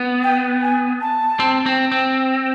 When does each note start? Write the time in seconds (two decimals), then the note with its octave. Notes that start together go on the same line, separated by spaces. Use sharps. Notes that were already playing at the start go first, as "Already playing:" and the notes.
Already playing: B3
0.23 G5
0.62 G#5
1.01 A5
1.40 C4
1.66 C4
1.92 C4